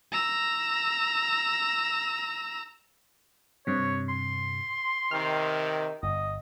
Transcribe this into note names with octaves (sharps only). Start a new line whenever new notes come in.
A#5 E6
G2 C3 C#5
C6
C3 D#3 F6
G1 D#5